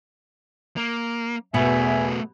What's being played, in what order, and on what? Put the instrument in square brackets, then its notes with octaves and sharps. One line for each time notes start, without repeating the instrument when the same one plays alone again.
[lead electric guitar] A#3
[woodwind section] E2 E5 [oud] B2 [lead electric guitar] A3 B3 [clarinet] G#5